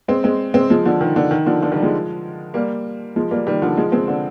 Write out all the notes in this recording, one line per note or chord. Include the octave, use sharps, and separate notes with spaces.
G#3 C4
G#3 C4
G#3 C4
F3 G#3
D3 F3
D#3
D3
D#3
D3 F3
D3 F3
D#3 G3
F3 G#3
G3 A#3
F3 G#3
G3 A#3
D#3 G3
D3 F3
F3 G#3
G#3 C4
D3